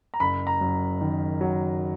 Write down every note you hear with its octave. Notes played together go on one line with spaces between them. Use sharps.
A#5
F#1 B5
A#5
F#2
D#3
F#3